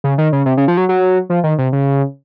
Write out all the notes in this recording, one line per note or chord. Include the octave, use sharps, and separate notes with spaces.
C#3
D#3
C#3
C3
C#3
F3
F#3
F#3
F3
D#3
C3
C#3